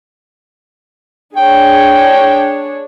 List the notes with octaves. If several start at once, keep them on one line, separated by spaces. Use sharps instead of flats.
D4 G#4 C#5 G5